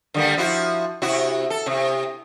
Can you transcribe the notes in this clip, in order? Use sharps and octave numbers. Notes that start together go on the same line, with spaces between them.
D3 G3 A#3
F3 E4 F#4
C3 E4 F#4
A4
C3